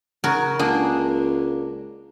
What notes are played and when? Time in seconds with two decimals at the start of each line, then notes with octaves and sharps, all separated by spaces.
0.24 C#3 F#4 A#4
0.59 C#2 A#3 D4 G#4